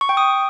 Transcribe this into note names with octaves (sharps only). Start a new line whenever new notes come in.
C#6
G5
D#6